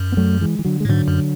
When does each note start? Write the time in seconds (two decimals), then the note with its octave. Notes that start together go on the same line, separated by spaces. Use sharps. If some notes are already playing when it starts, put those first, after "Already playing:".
Already playing: F#2
0.12 B3
0.17 F#3 A3
0.41 E3 G#3
0.59 E3
0.65 D3 F#3
0.80 G#3
0.85 A2
0.89 G#2 D3 F#3
1.08 F#2